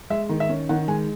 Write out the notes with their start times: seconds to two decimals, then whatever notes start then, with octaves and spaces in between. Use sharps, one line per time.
0.10 G#3 E5
0.29 D#3
0.40 E5
0.49 C#4
0.69 D#3 F#5
0.88 G#3 G#5